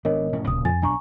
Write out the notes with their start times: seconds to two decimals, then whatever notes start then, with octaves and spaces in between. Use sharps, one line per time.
0.05 G#1 B3 D4 A#4 C#5 D#5
0.33 F1 A2 C#4
0.47 D1 A#2 C#3 D#6
0.65 F2 G#5 A6
0.82 B1 D4 G#5 A#5 C#6